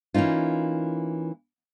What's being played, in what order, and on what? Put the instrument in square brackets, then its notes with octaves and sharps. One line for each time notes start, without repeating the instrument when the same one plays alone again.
[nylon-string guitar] E3 A#3 C#4 D#4 F4